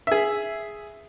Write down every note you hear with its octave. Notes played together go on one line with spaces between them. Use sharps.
G#4 E5